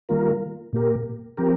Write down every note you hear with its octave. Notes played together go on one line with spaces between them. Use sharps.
D#3 G3 A#3 F4 A#4
A#2 A#3 G4 A#4
F3 C4 G4 A#4